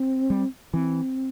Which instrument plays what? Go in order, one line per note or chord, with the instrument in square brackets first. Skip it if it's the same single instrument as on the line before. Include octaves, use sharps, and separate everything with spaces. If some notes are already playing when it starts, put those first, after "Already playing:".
Already playing: [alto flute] C4
[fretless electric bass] G3
[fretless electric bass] E3 [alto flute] C4